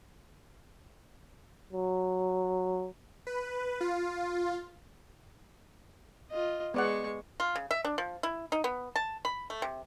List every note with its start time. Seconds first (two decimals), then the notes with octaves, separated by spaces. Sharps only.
1.73 F#3
3.27 B4
3.81 F4
6.31 F4 D#5
6.74 G#3 B3 D5 F#5 C#6
7.40 F4
7.55 C#3
7.71 E5
7.85 D4
7.98 F3
8.23 E4
8.52 D#4
8.64 B3
8.96 A5
9.25 B5
9.50 A3
9.62 C3